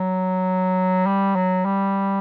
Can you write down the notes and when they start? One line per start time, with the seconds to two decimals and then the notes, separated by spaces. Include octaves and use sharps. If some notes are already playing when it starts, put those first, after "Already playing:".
Already playing: F#3
1.06 G3
1.36 F#3
1.65 G3